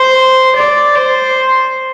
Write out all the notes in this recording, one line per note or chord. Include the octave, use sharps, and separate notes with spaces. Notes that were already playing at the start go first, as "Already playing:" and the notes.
Already playing: C5
D5
C5